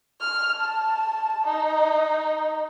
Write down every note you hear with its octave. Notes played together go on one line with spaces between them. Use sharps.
F6
A5
D#4